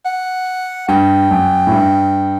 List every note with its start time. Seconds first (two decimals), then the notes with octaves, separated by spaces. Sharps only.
0.05 F#5
0.88 G2 G5
1.31 F#2
1.67 A2
1.72 G2